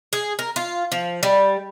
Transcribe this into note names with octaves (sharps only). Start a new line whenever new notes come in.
G#4
A#4
F4
F3
G3